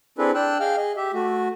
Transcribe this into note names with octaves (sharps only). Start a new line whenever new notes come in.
C4 D4 E4 G#4 A4 B4
D4 G5 E6 F#6
G#4 D#5 F5 G5 F6
G#4 D#5
G4 E5
A3 F#4